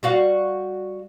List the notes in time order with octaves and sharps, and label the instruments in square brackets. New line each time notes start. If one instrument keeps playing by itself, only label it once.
[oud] G3 F#4 F5